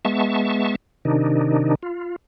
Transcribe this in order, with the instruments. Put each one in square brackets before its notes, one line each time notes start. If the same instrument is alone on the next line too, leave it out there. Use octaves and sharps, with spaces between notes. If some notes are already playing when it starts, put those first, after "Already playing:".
[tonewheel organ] G#3 B3 E5 A5 C#6
C3 D#3 D4 D#4
F4